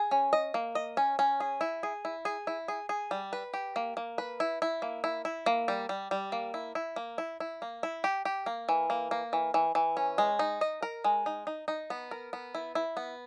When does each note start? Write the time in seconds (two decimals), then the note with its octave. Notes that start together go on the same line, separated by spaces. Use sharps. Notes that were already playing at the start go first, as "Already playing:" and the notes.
Already playing: G#4
0.11 C#4
0.33 D#5
0.54 A#3
0.75 D#5
0.97 C#4
1.19 C#4
1.40 G#4
1.61 E4
1.83 G#4
2.05 E4
2.25 G#4
2.47 E4
2.68 G#4
2.89 G#4
3.11 G3
3.33 B4
3.54 G4
3.76 A#3
3.97 A#3
4.18 B4
4.40 E4
4.62 E4
4.82 A#3
5.04 E4
5.25 E4
5.46 A#3
5.68 G3
5.89 G3
6.11 G3
6.32 A#3
6.54 E4
6.75 E4
6.96 A#3
7.18 E4
7.40 E4
7.62 A#3
7.83 E4
8.04 G4
8.25 G4
8.46 A#3
8.69 E3
8.90 A#3
9.11 A#3
9.33 E3
9.54 E3
9.75 E3
9.97 C#4
10.18 G#3
10.39 D#4
10.61 D#5
10.82 A#4
11.04 G#3
11.26 D#4
11.47 D#4
11.68 D#4
11.90 B3
12.11 A#4
12.33 B3
12.55 E4
12.75 E4
12.97 B3